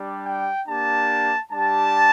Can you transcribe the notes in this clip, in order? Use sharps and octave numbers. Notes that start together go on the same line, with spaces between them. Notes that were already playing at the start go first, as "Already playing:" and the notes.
Already playing: G3 D4 G4
G5
A#3 D4 G4 A5
G3 D4 G4 A5